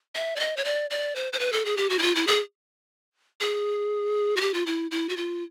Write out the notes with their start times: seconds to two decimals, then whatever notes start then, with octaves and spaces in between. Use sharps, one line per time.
0.15 E5
0.36 D5
0.40 D#5
0.57 C#5
0.65 D5
0.90 D5
1.16 C5
1.33 C5
1.39 B4
1.53 A4
1.65 G#4
1.77 G4
1.90 F#4
1.99 E4
2.02 F4
2.15 E4
2.27 G#4
3.41 G#4
4.37 F#4
4.41 G4
4.54 F4
4.66 E4
4.91 E4
5.09 F#4
5.17 F4